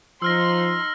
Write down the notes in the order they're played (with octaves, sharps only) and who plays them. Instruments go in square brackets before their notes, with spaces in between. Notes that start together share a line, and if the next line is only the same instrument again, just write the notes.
[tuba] F3 [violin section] D#4 C6 [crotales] E6 F6 A#6